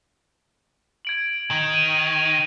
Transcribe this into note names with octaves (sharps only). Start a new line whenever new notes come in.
G#6 D7 F#7
D#3
D#7